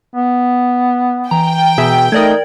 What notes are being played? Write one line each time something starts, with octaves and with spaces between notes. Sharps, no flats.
B3
E3 G5 A#5
B2 G#4 E5
A3 D#4 A#4 D5 D#5 G#6